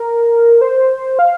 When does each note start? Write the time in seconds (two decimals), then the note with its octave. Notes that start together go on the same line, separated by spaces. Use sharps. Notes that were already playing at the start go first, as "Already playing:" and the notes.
Already playing: A#4
0.61 C5
1.19 F5